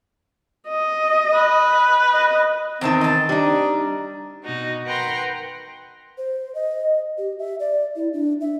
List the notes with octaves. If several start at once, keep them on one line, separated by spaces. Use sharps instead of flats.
D#5
B4
D#5
E2 D#3 C4 A5 A#5
D#5 A5
G3 D4 D#4
B2 D#4 F#4
A#4 B4 F#5 G5 A#5 C6
C5
D#5
G4
E5
D5
E4
D4
E5